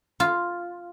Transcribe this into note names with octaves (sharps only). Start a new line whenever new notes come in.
F4